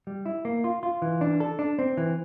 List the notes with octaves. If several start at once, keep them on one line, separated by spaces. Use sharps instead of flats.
G3
E4
A#3
F4
F4
E3
D4
A4
D4
C4
E3